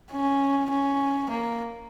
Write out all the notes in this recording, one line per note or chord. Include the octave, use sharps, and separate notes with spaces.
C#4
C#4
A#3